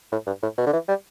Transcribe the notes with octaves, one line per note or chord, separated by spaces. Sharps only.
A2
G2
A2
B2
D3
E3
G3